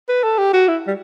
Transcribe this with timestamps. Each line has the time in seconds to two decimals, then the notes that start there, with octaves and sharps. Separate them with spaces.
0.09 B4
0.23 A4
0.38 G4
0.53 F#4
0.68 E4
0.87 G3